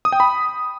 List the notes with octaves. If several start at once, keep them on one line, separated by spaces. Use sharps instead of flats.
D#6
G5
B5